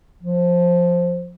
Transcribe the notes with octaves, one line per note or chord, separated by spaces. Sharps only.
F3